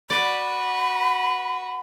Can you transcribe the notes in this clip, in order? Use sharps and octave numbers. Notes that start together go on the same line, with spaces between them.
F#4 B4 D5 B5